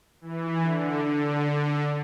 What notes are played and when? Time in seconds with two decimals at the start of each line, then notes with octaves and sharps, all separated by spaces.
0.21 E3
0.62 D3
1.04 D3